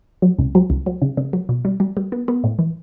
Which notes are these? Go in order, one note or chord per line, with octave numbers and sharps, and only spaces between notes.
F#3
C#2
F#3
C#2
F#3
C#3
C#3
F#3
B2
G3
G3
G3
B3
B3
A2
E3